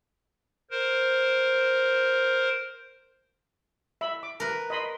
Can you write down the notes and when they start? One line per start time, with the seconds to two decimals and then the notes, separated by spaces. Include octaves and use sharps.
0.71 A#4 C5
4.01 E5 B5
4.23 D6
4.40 A#4 B4
4.70 D#5 B5 C6